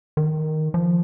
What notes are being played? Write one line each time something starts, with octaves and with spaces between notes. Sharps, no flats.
D#3
F3